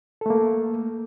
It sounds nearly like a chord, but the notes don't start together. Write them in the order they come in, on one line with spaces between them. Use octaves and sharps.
A4 A3 A#3